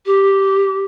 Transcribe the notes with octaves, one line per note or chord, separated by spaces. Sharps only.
G4